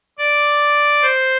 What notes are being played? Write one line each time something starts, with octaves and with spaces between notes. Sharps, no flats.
D5
C5